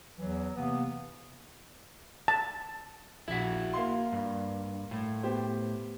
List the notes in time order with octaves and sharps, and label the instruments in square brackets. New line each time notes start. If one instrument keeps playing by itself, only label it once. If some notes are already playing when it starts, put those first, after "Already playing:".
[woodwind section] E2 E3 F#3
C3 E3 A#3 B3
[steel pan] A5
[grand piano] A#1 B6 [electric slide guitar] E4 F#4
[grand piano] A#3 F5 C6
[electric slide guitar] G2
A2
[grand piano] B3 G4 C5